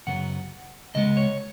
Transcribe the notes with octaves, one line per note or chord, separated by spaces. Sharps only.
F#2 C#3 F#3 B3 F#5
C#2 C#3 G#3 B3 D#5
C#5